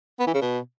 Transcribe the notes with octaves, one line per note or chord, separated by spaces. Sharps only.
B3
E3
C#3
B2